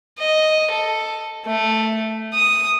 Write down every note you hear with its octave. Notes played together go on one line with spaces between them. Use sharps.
D#5
A4
A3
D#6